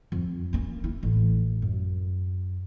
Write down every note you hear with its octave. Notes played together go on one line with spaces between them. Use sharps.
F2
A#3 C#4
E4
A1
F#2